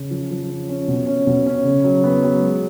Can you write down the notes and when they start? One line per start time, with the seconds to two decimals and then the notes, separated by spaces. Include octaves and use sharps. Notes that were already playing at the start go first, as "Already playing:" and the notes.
Already playing: C#3
0.11 F3
0.31 F3
0.49 C#4
0.69 C#4
0.88 B2
1.07 C#4
1.27 B2
1.46 C#4
1.64 C#3
1.84 F#3
2.04 B3
2.22 F#3
2.41 G#3